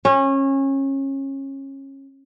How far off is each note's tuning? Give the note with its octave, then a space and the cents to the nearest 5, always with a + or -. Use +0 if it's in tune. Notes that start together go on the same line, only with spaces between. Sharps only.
C#4 -25